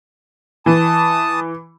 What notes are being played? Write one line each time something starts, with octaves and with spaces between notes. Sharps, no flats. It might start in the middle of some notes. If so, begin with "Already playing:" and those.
E3 A5 D#6